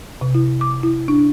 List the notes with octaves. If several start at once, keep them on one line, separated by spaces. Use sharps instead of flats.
C3
E4
D6
E4
D4